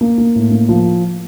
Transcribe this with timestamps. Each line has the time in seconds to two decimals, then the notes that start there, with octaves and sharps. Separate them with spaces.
0.01 A#3
0.18 A#3
0.35 A2
0.52 A#3
0.69 F3